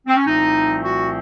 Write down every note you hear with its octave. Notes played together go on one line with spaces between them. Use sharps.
C4
C#4
C2 A#2 F3 A3 C4 D#4
F#4